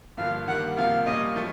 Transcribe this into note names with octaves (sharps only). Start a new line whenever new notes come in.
G2 D3 F3 A#3 F5
D#3 G3 A#3 F#5
C3 F3 A#3 F5
A#2 G3 A#3 C#4 D#5
F3 A3